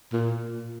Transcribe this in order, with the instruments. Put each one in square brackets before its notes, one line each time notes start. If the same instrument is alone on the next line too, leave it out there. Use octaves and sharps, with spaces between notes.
[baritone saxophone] A#2